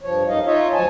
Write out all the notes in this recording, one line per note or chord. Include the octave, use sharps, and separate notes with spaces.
G2 F3 C#5
F#2 D#4 D#5 F5
D#4 F4 C#5 D#5 E5
D2 F3 F#3 C#5 G#5 A5